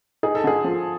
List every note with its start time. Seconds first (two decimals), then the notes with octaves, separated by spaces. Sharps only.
0.23 D#4 G#4
0.35 A4
0.44 D3 G#4
0.64 F3